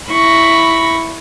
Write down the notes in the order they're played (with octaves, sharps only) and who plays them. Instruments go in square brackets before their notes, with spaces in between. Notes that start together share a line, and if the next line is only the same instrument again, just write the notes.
[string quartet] E4 B5 C#6 A#6